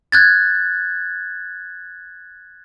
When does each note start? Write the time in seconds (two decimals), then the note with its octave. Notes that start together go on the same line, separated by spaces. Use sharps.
0.12 F#6 G#6 A6